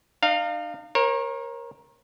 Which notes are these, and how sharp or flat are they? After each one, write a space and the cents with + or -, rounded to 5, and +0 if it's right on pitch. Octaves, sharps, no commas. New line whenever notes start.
D#4 -45 F5 +0
A#4 +15 C#5 -40